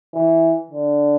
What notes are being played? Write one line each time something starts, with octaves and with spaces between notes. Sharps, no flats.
E3
D3